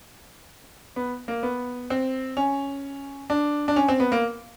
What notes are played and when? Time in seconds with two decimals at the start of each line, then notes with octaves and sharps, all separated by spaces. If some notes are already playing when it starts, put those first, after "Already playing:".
0.96 B3
1.28 A#3
1.43 B3
1.90 C4
2.37 C#4
3.30 D4
3.68 D4
3.76 C#4
3.88 C4
4.00 B3
4.12 A#3